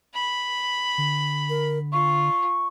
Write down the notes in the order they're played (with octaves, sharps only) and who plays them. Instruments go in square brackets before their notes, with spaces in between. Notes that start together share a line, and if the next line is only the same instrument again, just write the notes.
[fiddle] B5
[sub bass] D3
[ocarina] A#4
[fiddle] F4 [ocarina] C#6